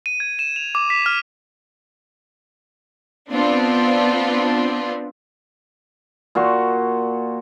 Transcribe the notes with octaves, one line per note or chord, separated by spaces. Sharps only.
D#7
G#6
E7
F7
D6
B6
F6
B3 C4 D4 F4
A#2 F#4 C6 C#6